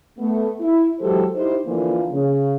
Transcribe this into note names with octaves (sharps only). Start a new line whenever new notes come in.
A3 B3
E4
E3 F#3 G#3 G4 A4 C5
D#4 E4 G4 C5
D3 E3 F3 A#3
C#3